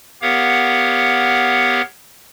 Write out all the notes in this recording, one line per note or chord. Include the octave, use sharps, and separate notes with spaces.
B3 G4 A#4 C#5 F5 F#5